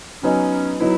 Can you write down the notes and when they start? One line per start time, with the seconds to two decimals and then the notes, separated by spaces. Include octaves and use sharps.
0.23 F#3 B3 C#4 D#4
0.80 F#3 B3 D#4 E4